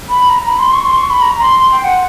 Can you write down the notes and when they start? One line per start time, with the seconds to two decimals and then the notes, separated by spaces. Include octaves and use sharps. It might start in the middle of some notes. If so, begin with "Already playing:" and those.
0.09 B5
0.29 A#5
0.48 B5
0.59 C6
0.73 C#6
0.85 C6
0.97 C#6
1.10 B5
1.22 A#5
1.40 C6
1.59 C6
1.72 G5
1.84 F#5